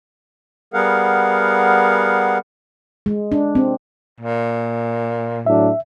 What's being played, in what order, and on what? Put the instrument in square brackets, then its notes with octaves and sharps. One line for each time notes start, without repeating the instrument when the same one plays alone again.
[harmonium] G3 B3 G#4 A#4 F5 F#5
[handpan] G#3
D4
C4
[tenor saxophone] A#2
[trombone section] A2 F#3 D4 [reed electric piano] E5